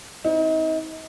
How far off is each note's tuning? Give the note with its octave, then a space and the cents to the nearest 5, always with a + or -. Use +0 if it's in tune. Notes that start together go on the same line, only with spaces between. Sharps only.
C4 +0 D#4 +35